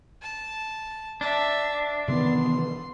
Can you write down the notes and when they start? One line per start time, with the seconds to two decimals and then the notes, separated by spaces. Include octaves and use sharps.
0.22 A5
1.21 D4 E5
2.08 C3 D#3 E3 B3 C6